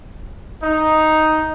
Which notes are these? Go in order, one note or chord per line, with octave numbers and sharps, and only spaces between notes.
D#4